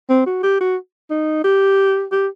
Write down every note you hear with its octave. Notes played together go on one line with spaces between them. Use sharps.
C4
F#4
G4
F#4
D#4
G4
G4